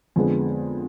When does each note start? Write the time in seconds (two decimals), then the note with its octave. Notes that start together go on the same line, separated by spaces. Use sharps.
0.16 F2 D3 G#3 B3